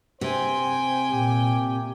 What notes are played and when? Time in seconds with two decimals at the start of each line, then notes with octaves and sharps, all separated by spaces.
0.21 C3 C5 G5 G#5
1.10 A#2 G4